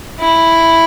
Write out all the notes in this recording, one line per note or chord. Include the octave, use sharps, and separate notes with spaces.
E4